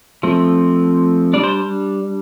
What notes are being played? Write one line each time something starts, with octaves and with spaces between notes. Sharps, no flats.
F3 A3 C4
G3 D4 D5
C5